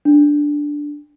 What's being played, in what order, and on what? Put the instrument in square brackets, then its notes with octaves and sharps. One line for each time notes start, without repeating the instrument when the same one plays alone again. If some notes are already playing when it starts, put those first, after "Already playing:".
[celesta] D4